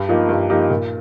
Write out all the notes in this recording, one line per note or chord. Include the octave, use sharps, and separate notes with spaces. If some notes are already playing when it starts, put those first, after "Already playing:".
Already playing: G2
F3 A#3 D#4 G4
G2
F3 A#3 D#4 G4
A#2